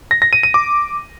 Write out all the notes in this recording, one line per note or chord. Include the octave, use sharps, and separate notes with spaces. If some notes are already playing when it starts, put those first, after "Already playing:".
A#6
A#6
D#7
D#7
D6